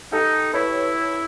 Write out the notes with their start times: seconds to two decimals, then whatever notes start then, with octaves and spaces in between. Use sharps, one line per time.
0.12 D#4 G4 A4
0.53 E4 B4 C#5